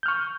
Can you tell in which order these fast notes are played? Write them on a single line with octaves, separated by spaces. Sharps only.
G6 F6 C#6